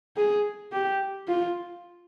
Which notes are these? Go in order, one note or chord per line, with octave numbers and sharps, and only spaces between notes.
G#4
G4
F4